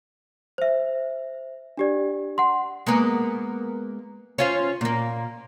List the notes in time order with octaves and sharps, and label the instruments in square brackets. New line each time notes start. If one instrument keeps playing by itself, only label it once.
[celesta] C5 E5
D4 G4 D5
F#5 C6
[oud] G#3 A#3 B3
C#4 F4 C5
A#2 A#3